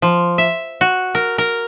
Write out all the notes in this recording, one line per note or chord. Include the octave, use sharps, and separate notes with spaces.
F3
E5
F#4
A#4
A#4